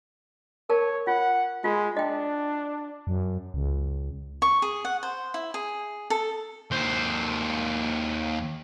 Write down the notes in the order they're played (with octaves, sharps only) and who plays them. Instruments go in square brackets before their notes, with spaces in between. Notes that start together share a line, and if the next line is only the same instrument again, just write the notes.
[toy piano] A#4 A5 [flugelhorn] C#5
[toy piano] F4 [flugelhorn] F#5
[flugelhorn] G#3 [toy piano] F4
[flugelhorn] D4 [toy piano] D#5 G5
[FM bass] F#2
C#2
[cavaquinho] C#6
G#4
F#5
C5
E4
G#4
A4
[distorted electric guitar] D#2 C5